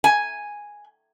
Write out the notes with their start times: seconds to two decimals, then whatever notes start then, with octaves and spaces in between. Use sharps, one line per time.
0.04 G#5